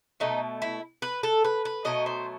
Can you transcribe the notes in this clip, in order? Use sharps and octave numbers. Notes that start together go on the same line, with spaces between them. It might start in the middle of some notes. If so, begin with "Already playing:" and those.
B2 A3 D#4
E4
B4
A4
B4
B4
B2 F#3 A3 D#5
C5